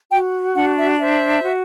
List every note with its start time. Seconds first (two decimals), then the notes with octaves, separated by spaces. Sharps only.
0.11 F#4 G5
0.56 D4 F#5
0.78 E5
1.00 C5 E5
1.44 F#4